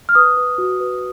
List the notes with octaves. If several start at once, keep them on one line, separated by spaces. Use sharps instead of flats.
F6
B4 D#6
B4
F#4
B4